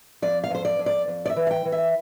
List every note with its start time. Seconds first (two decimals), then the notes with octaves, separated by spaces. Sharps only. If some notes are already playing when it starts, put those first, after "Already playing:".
0.22 F2 D5
0.44 F5
0.50 F2 C5
0.65 D5
0.79 F2
0.86 D5
1.08 F2
1.26 D5
1.30 E5
1.36 E3
1.47 F5
1.51 G5
1.65 E3
1.72 E5